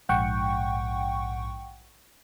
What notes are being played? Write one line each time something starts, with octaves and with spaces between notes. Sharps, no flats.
A#1 G#2 F#5 G5 C#6